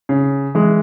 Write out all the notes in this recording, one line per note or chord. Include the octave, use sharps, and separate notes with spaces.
C#3
E3 G#3